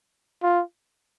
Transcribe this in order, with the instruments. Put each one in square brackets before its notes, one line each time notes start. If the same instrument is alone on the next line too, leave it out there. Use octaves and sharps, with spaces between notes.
[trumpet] F4